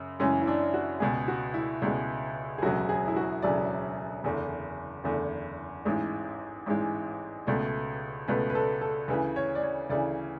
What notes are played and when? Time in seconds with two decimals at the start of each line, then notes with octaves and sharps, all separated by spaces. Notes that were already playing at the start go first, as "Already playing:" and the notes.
Already playing: F#2 C#3
0.20 F#2 C#3 E3 G#3 C#4
0.42 E4
0.47 D4
0.74 F#4
1.00 C#2 B2 G#3 G#4
1.28 F#4
1.54 E4
1.82 C#2 B2 G#3
2.58 G#4
2.62 E1 D2 C#3 F#3 F#4
2.89 G#4
3.08 E4
3.16 F#4
3.42 E1 D2 C#3 F#3 D5
4.24 F#1 E2 D3
5.04 F#1 E2 D3
5.85 A1 G#2 E3 G#3
6.66 A1 G#2 E3 G#3
7.47 C#2 B2 A3
8.28 C#2 B2 A3 B4
8.50 B4
8.55 A4
8.81 A4
9.08 D2 C#3 E3 B4
9.36 C#5
9.55 D5
9.63 C#5
9.90 D2 C#3 E3 D5